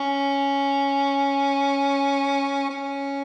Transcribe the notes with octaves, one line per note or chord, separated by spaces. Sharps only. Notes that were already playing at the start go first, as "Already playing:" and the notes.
Already playing: C#4
C#4